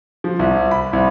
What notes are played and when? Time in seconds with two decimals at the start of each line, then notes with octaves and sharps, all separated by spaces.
0.24 F3
0.39 C2
0.71 B5
0.93 C2